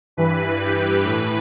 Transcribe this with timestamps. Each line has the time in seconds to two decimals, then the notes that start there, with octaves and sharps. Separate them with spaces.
0.17 G2 E3 B4
0.61 G4
1.04 A2 E3 B4